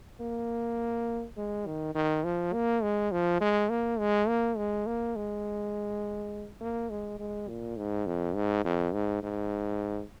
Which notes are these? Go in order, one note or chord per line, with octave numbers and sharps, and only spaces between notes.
A#3
G#3
D#3
D#3
F3
A#3
G#3
F3
G#3
A#3
G#3
A#3
G#3
A#3
G#3
A#3
G#3
G#3
A#2
G#2
F2
G#2
F2
G#2
G#2